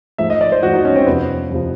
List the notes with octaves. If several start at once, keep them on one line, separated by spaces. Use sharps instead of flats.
G#2 F3 A3 E5
D#5
D5
C5
G#2 F3 A3 F#4
D#4
C#4
C4
F2 C3 F3 B3
F2 C3 F3